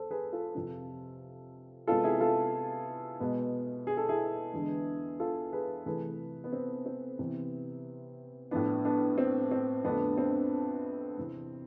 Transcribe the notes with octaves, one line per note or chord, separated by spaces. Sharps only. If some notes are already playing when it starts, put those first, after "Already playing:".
Already playing: E2 A4 C5
G#4 B4
F4 A4
F2 C3 F3
C3 G#3 B3 F4 A4
E4 G#4
F4 A4
B2 G#3 B3
G#4
A4
E4 G#4
E2 D3 G#3 B3
F4 A4
G#4 B4
C3 E3 A3 G#4 B4
B3
C4
C4
C3 E3 B3
A2 F3 B3 D4
B3 D4
C4
C4
F2 D3 A3 B3 D4
C4
E2 C3 E3